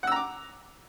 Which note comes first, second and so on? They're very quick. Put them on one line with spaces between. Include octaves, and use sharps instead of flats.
F#5 E6 A#5 D6